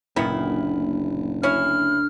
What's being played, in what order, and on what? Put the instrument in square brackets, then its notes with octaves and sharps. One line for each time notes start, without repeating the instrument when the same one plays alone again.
[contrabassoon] F#1 [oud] D2 A#2 [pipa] D#3 B3 E4
[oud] D2 F5 [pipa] C#4 E4 [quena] F6